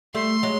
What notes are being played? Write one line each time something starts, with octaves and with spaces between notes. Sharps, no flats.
G3 A3 C6
F#3 G#3